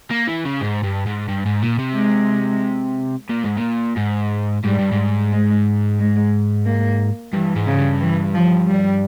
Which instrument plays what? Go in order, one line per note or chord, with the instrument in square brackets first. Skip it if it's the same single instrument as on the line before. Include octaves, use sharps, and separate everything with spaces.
[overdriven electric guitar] A#3
E3
C#3
G#2
G2
G#2
G2
G#2
A#2
C3
[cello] G#3
[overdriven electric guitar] A#2
G#2
A#2
G#2
[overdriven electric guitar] G#2 [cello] G3
[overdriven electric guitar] G2
G#2
[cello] G#3
G#3
A#3
[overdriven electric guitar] G2 [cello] E3
[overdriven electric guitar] G#2
[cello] C#3
[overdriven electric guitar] G2
[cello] E3
F3
G3